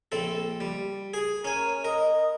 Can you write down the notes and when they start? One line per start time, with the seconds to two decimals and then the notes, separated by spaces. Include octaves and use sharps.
0.12 A#1 C4 A4
0.60 G3
1.14 G#4
1.45 C#4 A#4 G#5
1.85 A#4 D#5